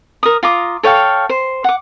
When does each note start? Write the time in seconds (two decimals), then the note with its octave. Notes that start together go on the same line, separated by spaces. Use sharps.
0.23 A#4 D#6
0.43 F4 A#5 D6 D#6
0.83 A4 C#5 F5 G5
1.29 C5
1.64 F#5 D6